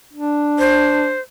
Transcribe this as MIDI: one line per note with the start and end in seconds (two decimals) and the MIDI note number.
0.13 1.14 62
0.59 1.20 72